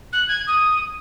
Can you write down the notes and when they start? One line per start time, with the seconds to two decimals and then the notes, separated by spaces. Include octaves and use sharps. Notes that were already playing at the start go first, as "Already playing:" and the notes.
0.12 F#6
0.28 G#6
0.47 D#6